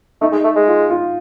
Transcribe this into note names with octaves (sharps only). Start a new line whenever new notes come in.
A3 D#4
G#3
A3
G#3
F4
F4